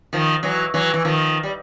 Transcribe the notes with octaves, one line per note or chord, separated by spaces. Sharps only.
D#3 F3
E3 F#3
E3 F#3
E3
D#3 F3
G3